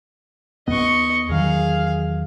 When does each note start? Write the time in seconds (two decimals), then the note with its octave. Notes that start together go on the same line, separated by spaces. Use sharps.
0.68 D#2 B3 D#5 C#6
1.29 E2 D#3 F#3 G#4 F5